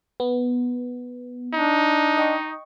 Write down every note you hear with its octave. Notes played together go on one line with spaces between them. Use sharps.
B3
D4 D#4
D#5 G5 C#6